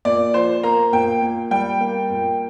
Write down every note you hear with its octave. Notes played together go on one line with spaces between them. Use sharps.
A#2 D5
F3 C5
A#3 A#5
A#2 G5
A#2
G3 G5
A#3
A#2